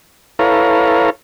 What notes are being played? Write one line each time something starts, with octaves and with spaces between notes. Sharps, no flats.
E4 A4 B4 C#5 F5 A#5